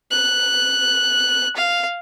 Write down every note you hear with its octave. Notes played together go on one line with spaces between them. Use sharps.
F#6
F5